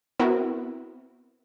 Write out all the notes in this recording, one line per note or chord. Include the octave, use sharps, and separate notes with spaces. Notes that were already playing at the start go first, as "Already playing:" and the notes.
B3 C4 E4 F#4 A#4